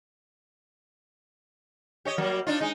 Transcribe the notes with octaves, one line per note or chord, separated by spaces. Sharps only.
G4 C#5 D#5
F#3 G3 A#3
D4 D#4 F4
G#3 D#4